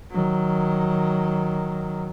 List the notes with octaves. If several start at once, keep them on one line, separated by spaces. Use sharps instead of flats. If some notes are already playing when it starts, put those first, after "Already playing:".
D#3 F#3